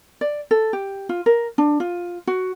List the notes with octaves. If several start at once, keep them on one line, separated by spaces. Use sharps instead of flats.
D5
A4
G4
F4
A#4
D4
F4
F#4